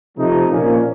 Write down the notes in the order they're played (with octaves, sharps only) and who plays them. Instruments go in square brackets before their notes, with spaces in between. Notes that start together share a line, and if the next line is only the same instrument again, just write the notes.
[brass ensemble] C3 F3 A3 D#4
A#2 F3 A#3 C#4